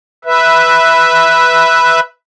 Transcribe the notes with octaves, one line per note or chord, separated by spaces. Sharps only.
B4 E5